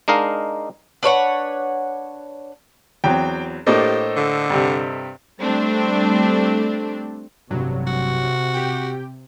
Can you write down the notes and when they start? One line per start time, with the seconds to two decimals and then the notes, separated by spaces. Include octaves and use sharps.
0.08 G#3 D4 D#4 A#4 F5
1.03 D4 B4 C#5 F#5
3.04 E2 F#3 C4 G5
3.66 A2 A#3 D4 G4 A4 C5 D#5
4.17 D3
4.50 G2 C3
5.40 G3 A3 C4 D4
7.50 A1 G2 C3 F#3
7.87 F#4
8.54 G4 G5